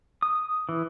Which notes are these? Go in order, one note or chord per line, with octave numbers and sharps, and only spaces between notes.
D#6
E3